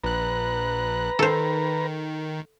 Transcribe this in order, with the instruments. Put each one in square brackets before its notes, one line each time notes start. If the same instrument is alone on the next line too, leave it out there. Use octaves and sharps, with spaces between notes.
[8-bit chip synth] A#1 F#6 [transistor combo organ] B4 A#5
[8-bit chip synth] D#3 [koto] A4 C5